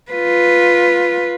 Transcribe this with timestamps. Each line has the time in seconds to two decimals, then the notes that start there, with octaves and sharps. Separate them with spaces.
0.12 F4 B4